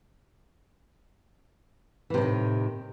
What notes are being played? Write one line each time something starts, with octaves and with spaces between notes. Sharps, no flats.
A2 C3 D#3 E3